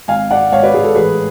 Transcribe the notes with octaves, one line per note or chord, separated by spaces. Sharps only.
G#1 F5 G#5
G#2 D5 F#5
G#2 C#5 F5
B4 D5
G#2 G#4
A4
A1 G#4 B4